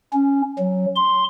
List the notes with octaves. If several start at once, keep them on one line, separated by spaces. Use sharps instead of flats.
C#4
F#3
C6